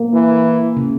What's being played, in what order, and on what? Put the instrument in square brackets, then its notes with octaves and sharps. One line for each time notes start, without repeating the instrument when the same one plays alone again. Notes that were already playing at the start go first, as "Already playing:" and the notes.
Already playing: [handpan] A#3
[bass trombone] E3
[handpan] C#3